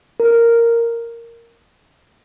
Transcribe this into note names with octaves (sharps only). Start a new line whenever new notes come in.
A#4